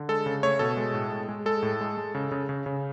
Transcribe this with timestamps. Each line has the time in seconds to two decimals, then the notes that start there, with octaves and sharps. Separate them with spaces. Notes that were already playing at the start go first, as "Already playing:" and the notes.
Already playing: D3
0.09 G#3 A4
0.26 C#3
0.43 A3 C#5
0.59 B2 A4
0.77 G#3
0.94 A2
1.11 G#3
1.29 G#3
1.46 G#3 A4
1.62 A2
1.81 G#3
1.97 G#3
2.15 C#3
2.31 C#3
2.49 C#3
2.66 C#3